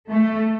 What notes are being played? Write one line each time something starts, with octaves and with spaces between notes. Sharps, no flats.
A3